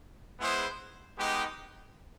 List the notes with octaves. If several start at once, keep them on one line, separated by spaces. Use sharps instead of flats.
G#3 B3 E4 G#4 C5
G#3 B3 D#4 G4